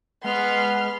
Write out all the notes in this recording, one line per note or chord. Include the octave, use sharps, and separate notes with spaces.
G#3 B3 F#5 C6 F6